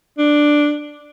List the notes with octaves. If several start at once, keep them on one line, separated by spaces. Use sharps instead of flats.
D4